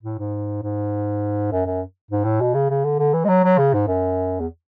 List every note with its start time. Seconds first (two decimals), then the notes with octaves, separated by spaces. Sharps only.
0.03 A2
0.18 G#2
0.63 G#2
1.52 F#2
1.66 F#2
2.11 G#2
2.25 A2
2.41 B2
2.54 C#3
2.70 C#3
2.84 D3
2.99 D3
3.13 E3
3.25 G#3
3.29 F#3
3.44 F#3
3.58 C#3
3.74 G#2
3.87 F#2
4.40 E2